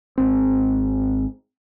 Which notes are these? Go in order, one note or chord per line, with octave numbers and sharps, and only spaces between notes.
G#1 C4